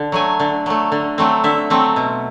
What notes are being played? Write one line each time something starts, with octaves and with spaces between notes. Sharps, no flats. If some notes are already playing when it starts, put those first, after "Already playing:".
Already playing: D3
F#3 A3 G#5
D3
F#3 A3
D3
F#3 A3 C4
D3 E5
F#3 A3 C4
B2